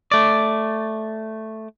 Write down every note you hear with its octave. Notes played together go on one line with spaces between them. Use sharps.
A3 D5